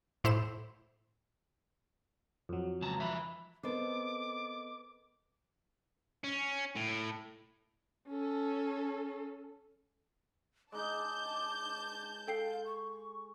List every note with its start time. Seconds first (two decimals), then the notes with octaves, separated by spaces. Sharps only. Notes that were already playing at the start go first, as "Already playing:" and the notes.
0.24 A2 E4 C5 E7
2.49 F2 F#3
2.82 C#2 A5 A#5
2.98 F3 E5 B5
3.63 B3 C4 A4 A#4 C5 D#5 D6
6.24 C#4
6.76 A2
8.09 C#4 A4
10.72 G#3 D#4 A5 D6 G6
12.28 A4 F5 G5 C7
12.66 C#6